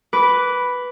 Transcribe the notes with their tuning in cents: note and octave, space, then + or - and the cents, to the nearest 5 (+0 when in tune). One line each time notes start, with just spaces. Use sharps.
B4 +0 D6 -20